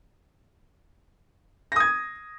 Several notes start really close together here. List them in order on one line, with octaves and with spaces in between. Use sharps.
A#6 D#6 G#6